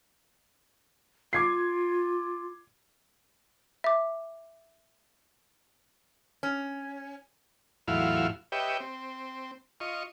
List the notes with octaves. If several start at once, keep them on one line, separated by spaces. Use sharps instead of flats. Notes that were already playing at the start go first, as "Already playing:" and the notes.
F4 D6 G#6 C7
E5 D6
C#4
E2 A2 F#3 E4 F4 F5
G4 B4 C#5 D#5 E5 G5
C4
F4 D#5 C#6